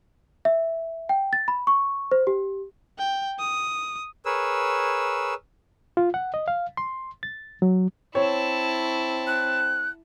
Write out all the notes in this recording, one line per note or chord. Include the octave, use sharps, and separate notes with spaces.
E5
G5
A6
B5
C#6
C5
G4
G5
D#6
G#4 A#4 B4 C#5 E6
F4
F#5
D#5
F5
C6
A6
F#3
C4 E4 C#5 A5
F#6